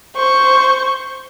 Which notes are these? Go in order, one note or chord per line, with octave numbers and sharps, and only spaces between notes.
C5 C#6